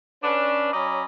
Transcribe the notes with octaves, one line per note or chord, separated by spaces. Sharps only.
C#4 D4 B4
F#3 C#4 D5 D#5 A#5 B5